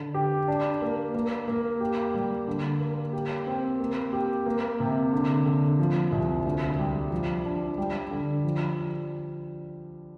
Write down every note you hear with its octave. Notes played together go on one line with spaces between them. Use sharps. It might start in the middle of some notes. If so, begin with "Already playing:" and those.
Already playing: D3
G4
D4
A#3
A#3
A#3
G4
G3
D3
A#3
G4
C4
A#3
G4
A#3
C3
D3
D3
F3
C2
D2
G3
F3
D4
G3
D3
F3